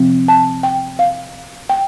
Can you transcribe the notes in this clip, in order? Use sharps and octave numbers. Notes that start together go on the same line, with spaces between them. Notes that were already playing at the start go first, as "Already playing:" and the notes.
Already playing: C3 F3 C4
A5
G5
F5
G5